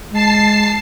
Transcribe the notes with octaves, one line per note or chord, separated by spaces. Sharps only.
G#3 A5 C7